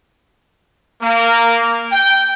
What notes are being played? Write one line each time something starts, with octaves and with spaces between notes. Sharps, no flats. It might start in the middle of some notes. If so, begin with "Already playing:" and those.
A#3
G5